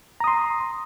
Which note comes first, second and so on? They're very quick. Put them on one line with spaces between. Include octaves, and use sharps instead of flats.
A#5 D#6 C6